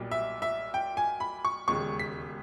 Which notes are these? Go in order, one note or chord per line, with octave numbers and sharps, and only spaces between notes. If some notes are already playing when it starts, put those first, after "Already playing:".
Already playing: B1 A#2 G3
E5
E5
G5
G#5
B5
C#6
E1 D#2 C#3 G#3 C#6
B6